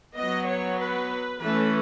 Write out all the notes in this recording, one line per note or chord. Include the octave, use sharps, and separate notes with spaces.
F#3 B3 D#5
C#5
B4
E3 A3 C#4 B4